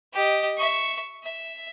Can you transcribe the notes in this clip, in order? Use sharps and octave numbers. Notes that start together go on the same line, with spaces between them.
G4 D#5
E5 C#6
E5